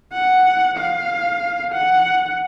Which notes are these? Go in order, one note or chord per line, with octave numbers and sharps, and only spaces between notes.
F#5
F5
F#5